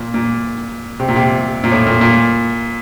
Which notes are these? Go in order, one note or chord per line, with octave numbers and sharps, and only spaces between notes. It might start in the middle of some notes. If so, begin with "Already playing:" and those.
Already playing: A#2
A#2
C3
A#2
C3
A#2
A2
A#2
A#2